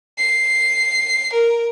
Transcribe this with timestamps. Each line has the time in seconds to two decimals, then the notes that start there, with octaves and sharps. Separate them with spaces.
0.18 C7
1.33 A#4